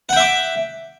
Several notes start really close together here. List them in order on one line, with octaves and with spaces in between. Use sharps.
F#5 G5 E5 D6